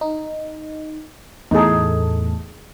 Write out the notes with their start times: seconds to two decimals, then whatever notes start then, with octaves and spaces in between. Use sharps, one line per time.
0.01 D#4
1.51 E2 A2 D#4 G#4 A4